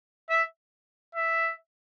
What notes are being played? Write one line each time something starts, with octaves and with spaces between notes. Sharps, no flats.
E5
E5